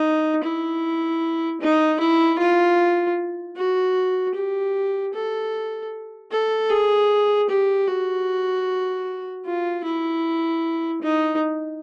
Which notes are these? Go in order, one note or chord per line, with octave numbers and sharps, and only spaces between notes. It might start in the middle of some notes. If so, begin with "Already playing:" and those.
Already playing: D#4
E4
D#4
E4
F4
F#4
G4
A4
A4
G#4
G4
F#4
F4
E4
D#4